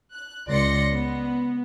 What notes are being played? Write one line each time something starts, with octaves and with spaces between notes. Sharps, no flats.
F#6
C#2 D5 C6 A#6 C#7
B3